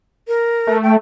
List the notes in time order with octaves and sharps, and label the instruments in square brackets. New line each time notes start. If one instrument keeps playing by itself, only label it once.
[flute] A#4
[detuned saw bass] A3
[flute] G5